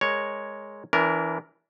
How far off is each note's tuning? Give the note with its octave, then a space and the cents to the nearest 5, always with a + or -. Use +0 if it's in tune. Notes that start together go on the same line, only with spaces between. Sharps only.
G#3 +0 A#4 +0 C#5 +0
E3 +0 D4 -45 A#4 +0